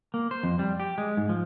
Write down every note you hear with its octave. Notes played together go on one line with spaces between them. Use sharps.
A#3
C5
F2
G3
G4
G#3
G#2
F3